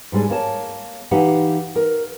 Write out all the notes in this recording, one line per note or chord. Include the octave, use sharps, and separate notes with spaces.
G#2 G3 G#3 D4
A#3 C#5 A5
E3 D#4 G4 F5 F#5
A#4